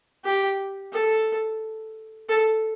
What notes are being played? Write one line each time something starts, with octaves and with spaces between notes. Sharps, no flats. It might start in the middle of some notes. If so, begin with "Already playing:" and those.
G4
A4
A4